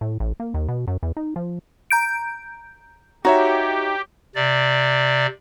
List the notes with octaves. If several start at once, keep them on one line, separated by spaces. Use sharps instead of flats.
A2
A1
A#3
D#2
B2
F#2
E2
D#4
F3
A#5 G6 D7
D#4 F#4 G4 C#5 E5
C3 D5